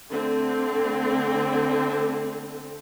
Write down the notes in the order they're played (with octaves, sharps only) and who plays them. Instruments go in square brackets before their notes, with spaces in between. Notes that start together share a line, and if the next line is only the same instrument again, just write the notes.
[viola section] D3 A3 C4